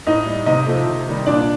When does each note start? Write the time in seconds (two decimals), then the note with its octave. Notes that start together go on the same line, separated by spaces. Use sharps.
0.07 A2 D#4 D#5
0.26 G3
0.46 C3 D#4 D#5
0.66 F3 A3
0.86 C3
1.07 D#3 G3
1.26 A#2 D4 D5